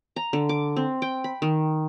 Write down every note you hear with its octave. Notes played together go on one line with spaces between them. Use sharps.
A#5
D3
D6
C4
G5
B5
D#3